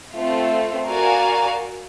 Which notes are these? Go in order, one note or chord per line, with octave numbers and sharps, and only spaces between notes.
A3 C4 F4
F#4 A#4 D5 F5 G#5